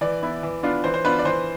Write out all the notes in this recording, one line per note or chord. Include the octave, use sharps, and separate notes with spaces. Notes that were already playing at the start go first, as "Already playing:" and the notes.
E3 D5
B3 E4
E3
B3 D4 F4
E3 C5
C5
B3 D4 F4 B4
D5
E3 C5